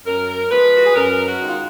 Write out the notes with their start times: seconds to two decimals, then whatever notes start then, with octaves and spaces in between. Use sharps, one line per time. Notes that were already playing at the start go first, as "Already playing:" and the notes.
0.06 F#2 A#4
0.51 F3 G#3 B4
0.77 F#4
0.86 G#4
0.96 F#2 A#4
1.26 F#4
1.41 D#3 G#3
1.48 F4